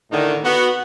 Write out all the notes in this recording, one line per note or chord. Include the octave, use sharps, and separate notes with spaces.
A2 D3 D#3 D#4
B3 F#4